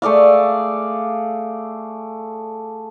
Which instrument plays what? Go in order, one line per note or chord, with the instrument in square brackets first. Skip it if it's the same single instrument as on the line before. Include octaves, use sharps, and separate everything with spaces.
[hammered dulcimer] A3 G#4 D5 F5